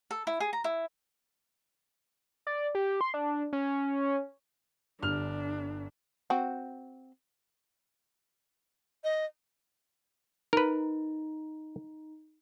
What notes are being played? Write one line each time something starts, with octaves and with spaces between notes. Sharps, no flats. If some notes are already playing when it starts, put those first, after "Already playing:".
A4
E4
G#4
A#5
E4
D5
G4
C6
D4
C#4
G1 D4 F6 F7
C4 F#4
D#5
D#4 A#4 B4